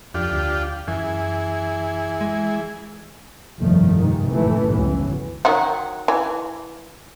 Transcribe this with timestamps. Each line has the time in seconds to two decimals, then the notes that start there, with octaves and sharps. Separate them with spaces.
0.14 F2 D4 F4 G4
0.31 D2
0.88 F#2 E3 G#4
2.21 G#3
3.60 G1 C2 F2 D#3 F3 A3
3.97 G#2 C3 D#3 G#3
4.31 F#1 A2 E3 A3
4.72 G1 C#2 E3 F#3
5.45 D#3 F#3 F#5
6.08 E3